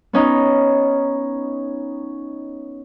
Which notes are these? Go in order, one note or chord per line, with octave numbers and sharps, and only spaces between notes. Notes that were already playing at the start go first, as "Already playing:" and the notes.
B3 C#4 D#4